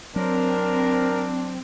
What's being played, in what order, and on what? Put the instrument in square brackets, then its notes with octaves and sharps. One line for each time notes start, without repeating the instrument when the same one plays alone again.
[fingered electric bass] F#3 [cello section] C4 [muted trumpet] D4 [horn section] A#4